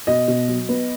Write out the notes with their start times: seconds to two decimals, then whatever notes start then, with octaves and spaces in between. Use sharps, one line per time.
0.07 B2 D#5
0.28 B2
0.48 F#3
0.69 B3